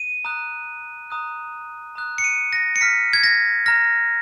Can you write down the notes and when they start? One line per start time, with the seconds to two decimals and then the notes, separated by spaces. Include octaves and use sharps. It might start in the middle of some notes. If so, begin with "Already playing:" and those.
Already playing: D#7
0.25 A#5 D#6 F#6
1.10 A#5 D#6 F#6
1.95 A#5 D#6 F#6
2.18 C#7
2.24 D#7
2.53 A#6
2.76 C#7
2.81 A#5 F6 B6
3.13 G#6
3.23 A#6
3.66 A#5 F6 A#6